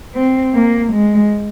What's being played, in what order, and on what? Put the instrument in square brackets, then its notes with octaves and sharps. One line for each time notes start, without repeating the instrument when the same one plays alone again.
[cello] C4
A#3
G#3